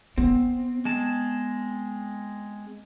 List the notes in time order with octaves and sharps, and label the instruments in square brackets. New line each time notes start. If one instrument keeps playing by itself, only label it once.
[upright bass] B3 [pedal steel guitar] C4
[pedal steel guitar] G#3 C4 A5